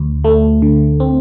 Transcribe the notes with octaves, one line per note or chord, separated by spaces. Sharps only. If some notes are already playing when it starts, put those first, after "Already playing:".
Already playing: D2
A3
D3
C4